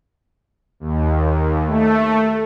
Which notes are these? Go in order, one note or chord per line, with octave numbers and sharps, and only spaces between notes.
D#2
A3